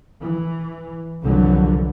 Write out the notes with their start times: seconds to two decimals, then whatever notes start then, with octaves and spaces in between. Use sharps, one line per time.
0.22 E3
1.22 C2 F2 D3 E3 F#3 G3